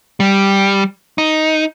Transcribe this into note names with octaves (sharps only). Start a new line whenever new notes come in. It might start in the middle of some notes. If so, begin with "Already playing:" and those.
G3
D#4